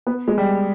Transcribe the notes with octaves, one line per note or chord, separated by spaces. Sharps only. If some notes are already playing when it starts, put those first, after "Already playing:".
B3
G#3
G3